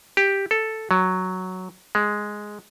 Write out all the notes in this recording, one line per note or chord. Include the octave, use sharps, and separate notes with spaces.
G4
A4
F#3
G#3